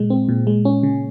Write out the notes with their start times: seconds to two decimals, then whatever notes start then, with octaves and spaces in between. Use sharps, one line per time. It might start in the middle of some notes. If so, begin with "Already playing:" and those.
Already playing: A#2 G#3
0.10 C4
0.29 A#2
0.47 G#3
0.65 C#4
0.83 C#3